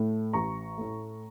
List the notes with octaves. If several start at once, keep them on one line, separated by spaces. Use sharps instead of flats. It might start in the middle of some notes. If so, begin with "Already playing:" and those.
Already playing: A2 A3
A1 A#5 C#6
A2 A3